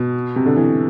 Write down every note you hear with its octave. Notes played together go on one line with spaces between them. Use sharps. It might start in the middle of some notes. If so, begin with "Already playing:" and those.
Already playing: B2
C3
D3
E3